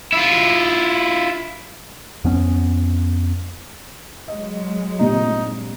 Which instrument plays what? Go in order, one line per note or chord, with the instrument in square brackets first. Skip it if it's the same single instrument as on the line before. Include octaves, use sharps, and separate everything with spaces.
[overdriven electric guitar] E4 F4
[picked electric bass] F2 B3 C#4
[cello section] F#3 G#3 [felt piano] D#5
[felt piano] G2 A#2 C4 [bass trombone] D#4